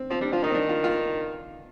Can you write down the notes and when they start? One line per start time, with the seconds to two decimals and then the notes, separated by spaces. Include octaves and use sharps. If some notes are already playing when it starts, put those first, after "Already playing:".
Already playing: C4
0.10 F3 C4
0.21 G3 D4
0.32 F3 F4
0.44 D#3 D#4
0.50 C4
0.55 D4
0.69 F4
0.84 F4